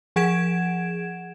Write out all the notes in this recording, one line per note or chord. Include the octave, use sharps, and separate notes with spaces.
F3 G#4 F#5 G#6 D7 E7